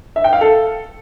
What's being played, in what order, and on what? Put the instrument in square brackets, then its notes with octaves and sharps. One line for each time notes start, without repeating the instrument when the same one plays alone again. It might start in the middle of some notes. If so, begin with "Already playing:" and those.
[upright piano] E5
G5
F5
A4